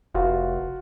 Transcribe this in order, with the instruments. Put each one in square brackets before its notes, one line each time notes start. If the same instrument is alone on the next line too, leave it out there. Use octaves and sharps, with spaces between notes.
[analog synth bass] F1 [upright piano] F4 F#4 F5